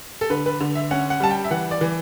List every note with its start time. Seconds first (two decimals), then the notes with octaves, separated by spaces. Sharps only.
0.21 A4
0.30 D3 B4
0.46 B4
0.60 D3
0.75 E5
0.91 C#4 F#5
1.10 F#5
1.20 G3 A5
1.31 G5
1.44 E5
1.51 E3 F#5
1.71 D5
1.81 E3